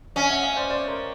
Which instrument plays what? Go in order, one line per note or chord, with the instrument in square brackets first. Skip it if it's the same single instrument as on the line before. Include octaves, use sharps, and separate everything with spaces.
[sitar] C#4 [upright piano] D#5 F5
[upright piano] E5 F#5
D#5 F5
C5 D5
C5 D5
A#4 C5